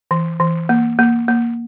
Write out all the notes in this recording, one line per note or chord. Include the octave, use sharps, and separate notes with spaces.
E3
E3
A#3
A#3
A#3